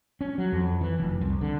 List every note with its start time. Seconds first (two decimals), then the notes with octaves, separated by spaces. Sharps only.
0.21 C#4
0.38 F#3
0.52 F2
0.81 E3
1.00 F1
1.21 C2
1.41 D3